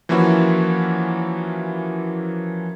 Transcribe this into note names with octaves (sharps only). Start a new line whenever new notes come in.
E3 F3 A#3 C#4 E4 F#4